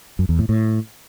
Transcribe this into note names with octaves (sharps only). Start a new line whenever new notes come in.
F#2
E2
A2
A2